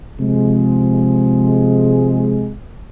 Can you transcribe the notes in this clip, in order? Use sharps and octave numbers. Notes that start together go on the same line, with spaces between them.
C3 F3 G#3